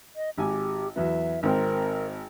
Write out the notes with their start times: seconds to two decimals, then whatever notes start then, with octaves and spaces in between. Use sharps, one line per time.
0.16 D#5
0.38 G#1 G4 G#5
0.96 E2 F#3 B3 E5
1.43 G#1 C4 A#4 G5